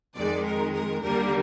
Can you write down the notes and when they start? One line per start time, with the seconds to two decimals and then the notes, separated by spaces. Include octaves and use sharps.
0.16 F2 D#3 G#3 D5
0.45 A#4
0.74 A#4
1.03 D#2 D3 G3 A#3 A#4